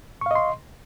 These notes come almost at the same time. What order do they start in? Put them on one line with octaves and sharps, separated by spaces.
C#6 F5 D#5 C6